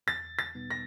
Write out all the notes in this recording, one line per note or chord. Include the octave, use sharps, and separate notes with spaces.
E2 A6
A6
B2 G3 B3 D#4
A#6